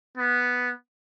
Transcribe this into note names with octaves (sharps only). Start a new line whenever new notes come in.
B3